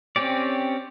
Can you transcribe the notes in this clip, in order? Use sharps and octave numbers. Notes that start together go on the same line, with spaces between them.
C4 C#4 G4 D5